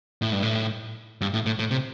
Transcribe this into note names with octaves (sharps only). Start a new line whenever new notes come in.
A2
G2
A2
G2
A2
A2
A2
C3